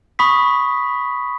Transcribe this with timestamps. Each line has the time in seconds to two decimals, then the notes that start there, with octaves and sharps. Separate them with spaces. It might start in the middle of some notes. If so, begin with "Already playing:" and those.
0.19 B5 C#6 D#6 B6